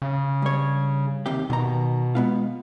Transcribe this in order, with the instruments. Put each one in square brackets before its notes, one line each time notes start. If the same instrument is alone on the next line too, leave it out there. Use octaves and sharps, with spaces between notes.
[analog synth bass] C#3
[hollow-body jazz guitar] G2 C#5
D#2 C3 G4
[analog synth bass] B2 [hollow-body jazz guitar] D#3 A#5
[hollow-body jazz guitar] G#3 B3 F4